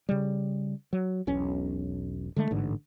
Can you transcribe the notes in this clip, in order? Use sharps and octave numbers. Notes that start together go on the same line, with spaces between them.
C#3 G3
F#3
E1 B1 C#4
D3 G#3 A3
A1 G#2 D3